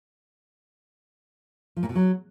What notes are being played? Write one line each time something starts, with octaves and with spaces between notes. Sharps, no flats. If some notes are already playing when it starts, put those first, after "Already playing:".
F3
A#2
B2
F#3